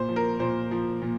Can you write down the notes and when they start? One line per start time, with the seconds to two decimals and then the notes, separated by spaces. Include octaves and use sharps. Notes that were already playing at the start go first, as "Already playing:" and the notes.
Already playing: A#2 C5
0.09 F3
0.16 A#4
0.40 A#2 C5
0.71 F3
1.02 A#2